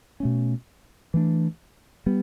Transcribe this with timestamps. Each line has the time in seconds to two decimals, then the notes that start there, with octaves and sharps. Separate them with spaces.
0.20 B2 A3 C#4
1.14 E3 A3 D4
2.06 G3 B3